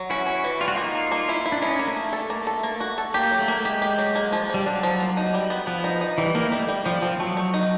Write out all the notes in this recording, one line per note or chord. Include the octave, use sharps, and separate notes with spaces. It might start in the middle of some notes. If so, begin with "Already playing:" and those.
Already playing: F#3
C#4 E4 F#4
C#4
E3
G3 F4
F#4
A#3 D#4 F4
A#3
A#3
E4
E4
D4
C#4 D#4 E4
A#3
A3
A#3
A4
A#3
A4
A#3
F#4
A4
A#3 G4
F#3
A3
A#3
G#3 G4
G4
F#3
A#3
F3
F3 G3
F#3 D4
F3
A#3
D#4
G3
B3
F3 B3
D#4
D#4
E3 G3
A#3 D#4
G3 A3
G3
F3 G3
F3 C4
F#3 A3
A3
D#4